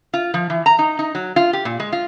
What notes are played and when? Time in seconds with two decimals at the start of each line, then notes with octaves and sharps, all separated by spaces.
0.14 F4
0.34 F3
0.50 E3
0.66 A#5
0.79 D#4
0.99 D#4
1.15 F#3
1.36 F4
1.53 G4
1.65 A#2
1.80 G#3
1.93 F4